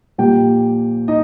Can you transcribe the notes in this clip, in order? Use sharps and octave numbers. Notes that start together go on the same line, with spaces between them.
A#2 F3 A#3 G4 G5
D#4 D#5